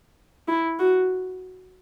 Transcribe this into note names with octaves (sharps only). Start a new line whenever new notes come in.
E4
F#4